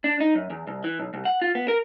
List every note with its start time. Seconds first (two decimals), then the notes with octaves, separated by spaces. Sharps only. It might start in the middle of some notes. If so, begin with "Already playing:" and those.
0.04 D4
0.20 D#4
0.35 F#2
0.50 E2
0.67 C2
0.84 E3
0.99 B1
1.14 C2
1.25 F#5
1.42 F4
1.55 B3
1.68 A#4